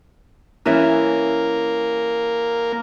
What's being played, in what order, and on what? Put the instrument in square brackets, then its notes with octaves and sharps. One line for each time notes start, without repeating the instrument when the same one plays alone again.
[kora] E3 C#4 E5 [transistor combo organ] A#3